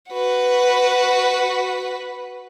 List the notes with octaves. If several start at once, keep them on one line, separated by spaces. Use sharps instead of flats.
F#4 B4